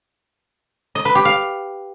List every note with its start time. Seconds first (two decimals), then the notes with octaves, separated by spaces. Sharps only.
0.95 D#5
1.05 B4
1.15 G4
1.25 F5